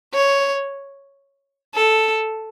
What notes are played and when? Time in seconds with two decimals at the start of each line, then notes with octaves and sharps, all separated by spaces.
0.14 C#5
1.75 A4